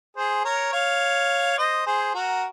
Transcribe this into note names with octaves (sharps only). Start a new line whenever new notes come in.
G#4 C5
A#4 C#5
C#5 F5
C5 D#5
G#4 C5
F#4 A#4